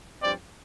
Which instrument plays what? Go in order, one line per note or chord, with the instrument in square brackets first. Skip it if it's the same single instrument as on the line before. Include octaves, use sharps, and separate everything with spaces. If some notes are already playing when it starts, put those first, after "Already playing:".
[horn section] G2 F3 C4 D5